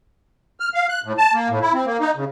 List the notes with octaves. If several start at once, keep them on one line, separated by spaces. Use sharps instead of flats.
F6
F5
F#6
A2
A5
A#3
A2
E4
C4
A#3
D#4
C#3